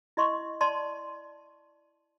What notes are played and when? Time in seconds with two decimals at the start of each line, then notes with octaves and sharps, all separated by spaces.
0.17 E4 D#5 C6 C#6
0.61 D5 A5 C6